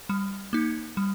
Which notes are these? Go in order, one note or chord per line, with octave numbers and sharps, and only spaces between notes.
G3
A#3 D#4
G3